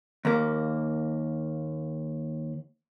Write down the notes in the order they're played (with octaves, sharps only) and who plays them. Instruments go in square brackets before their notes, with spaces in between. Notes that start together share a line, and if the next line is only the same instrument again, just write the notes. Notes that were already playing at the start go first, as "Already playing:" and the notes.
[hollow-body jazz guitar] D#2 A#3